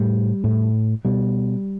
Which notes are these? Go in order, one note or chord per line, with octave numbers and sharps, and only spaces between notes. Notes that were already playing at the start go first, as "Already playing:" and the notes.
Already playing: A2 G3
A2
B2 G3